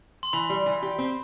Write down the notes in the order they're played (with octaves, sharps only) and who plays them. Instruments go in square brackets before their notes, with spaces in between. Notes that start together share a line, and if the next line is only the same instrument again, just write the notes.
[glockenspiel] C6
[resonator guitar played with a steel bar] E3 [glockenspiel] B5
[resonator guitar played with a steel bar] G3
E3
G4
C4